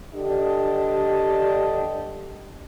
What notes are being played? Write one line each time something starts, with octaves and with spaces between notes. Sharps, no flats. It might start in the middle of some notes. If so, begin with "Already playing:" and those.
G2 D3 D4 G4 D#5